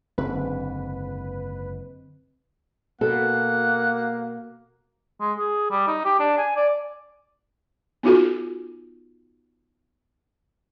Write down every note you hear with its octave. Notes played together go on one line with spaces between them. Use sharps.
F#1 G#2 D3 C4 B4
B2 A#3 B3 A4 F#5
G#3
G#4
G3
D#4
G4
D4
G#5
D5
B3 D#4 F4 F#4 A4